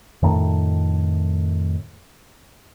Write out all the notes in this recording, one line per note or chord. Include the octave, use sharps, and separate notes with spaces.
F2 A2 D#3 A3